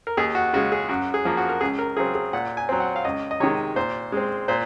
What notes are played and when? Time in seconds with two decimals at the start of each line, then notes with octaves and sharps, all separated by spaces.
0.07 A#4
0.17 D#2 G#4
0.35 F#4
0.53 C#3 G#3 F#4
0.72 G#4
0.89 F#2 F#4
1.14 G#4
1.25 F3 A#3
1.37 F#4
1.49 A#4
1.61 C#2 G#4
1.79 A#4
1.97 C#3 F#3 C4 G#4
2.15 G#4
2.33 A#2 F#5
2.57 G#5
2.69 F#3 C4
2.80 F#5
2.96 F5
3.04 C#2 D#5
3.31 D#5
3.40 C3 D#3 G#3 C#5
3.76 A#2 C5
4.12 G#3 C4
4.48 A#2 C5